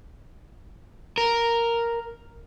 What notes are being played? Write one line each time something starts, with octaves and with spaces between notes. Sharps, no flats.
A#4